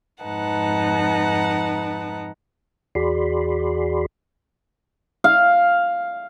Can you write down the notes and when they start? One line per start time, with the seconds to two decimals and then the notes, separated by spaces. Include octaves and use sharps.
0.24 F2 G#2 D#4 B4 F#5 A5
2.95 E2 F#4 G#4 D5 B5 C6
5.24 F5